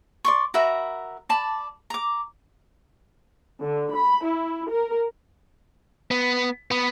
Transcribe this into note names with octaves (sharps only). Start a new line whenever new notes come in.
D5 C6 C#6
F#4 A#4 E5 B5
D5 A5 B5
A#5 D6
D3
B5
E4
A#4
B3
B3